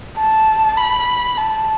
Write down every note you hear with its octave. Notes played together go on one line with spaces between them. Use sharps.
A5
B5
A5